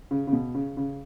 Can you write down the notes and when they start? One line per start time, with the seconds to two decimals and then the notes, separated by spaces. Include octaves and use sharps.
0.11 C#3
0.27 C#3
0.33 B2
0.54 C#3
0.77 C#3